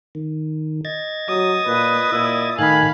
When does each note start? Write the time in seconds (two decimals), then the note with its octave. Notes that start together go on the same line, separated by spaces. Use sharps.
0.15 D#3
0.85 D#5 G#6 A6
1.28 F#3 D#6
1.67 A#2 B4
2.12 A#2 E4
2.59 A2 D#3 A4 F5 G#5 B5 F#6